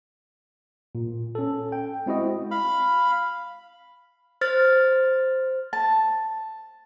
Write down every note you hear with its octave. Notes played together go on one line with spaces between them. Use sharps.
A#2
C#4 A4
G5
G#3 C4 E4 F#4 D#5
F5 B5
C5 F6 A6
A5